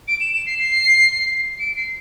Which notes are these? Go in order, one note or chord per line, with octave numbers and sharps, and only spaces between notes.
D7
E7
E7
C7
C7
D7
C7